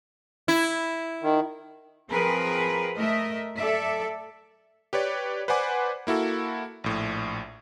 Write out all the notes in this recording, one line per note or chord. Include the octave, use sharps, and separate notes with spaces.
E4
D#3
F3 C4 G#4 A#4 B4
A3 A#4 D#5 E5
A4 D5 E5
G4 B4 C#5 D5
B4 C5 D5 F#5 G#5 D6
A#3 E4 F#4 A4
A#1 A2